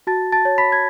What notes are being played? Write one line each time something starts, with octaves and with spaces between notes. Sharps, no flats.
F#4 A5 A6
A5 A6
C#5
B5 B6
G#6